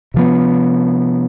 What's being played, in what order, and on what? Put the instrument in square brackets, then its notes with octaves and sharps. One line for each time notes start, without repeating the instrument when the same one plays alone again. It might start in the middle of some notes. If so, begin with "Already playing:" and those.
[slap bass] C3 F3 B3